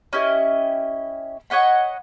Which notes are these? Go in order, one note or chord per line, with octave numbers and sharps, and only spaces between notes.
C#4 E4 G4 D#5
C#5 D#5 F#5 B5